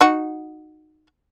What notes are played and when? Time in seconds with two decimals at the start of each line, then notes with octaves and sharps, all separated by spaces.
0.01 D#4 F#4